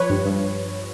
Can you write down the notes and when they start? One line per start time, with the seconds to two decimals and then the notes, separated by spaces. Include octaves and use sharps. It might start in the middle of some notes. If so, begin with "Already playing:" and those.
Already playing: F3 B4 C#5
0.10 G2
0.25 G2